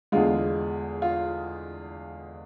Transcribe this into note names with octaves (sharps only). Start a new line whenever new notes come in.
E2 D3 G#3 F4
F4